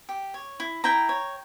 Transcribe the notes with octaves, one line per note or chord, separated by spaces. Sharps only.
G4
C#5
E4
E4 G5 A#5
C#5